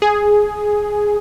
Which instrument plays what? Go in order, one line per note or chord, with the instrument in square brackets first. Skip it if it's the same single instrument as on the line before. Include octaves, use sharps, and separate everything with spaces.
[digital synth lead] G#4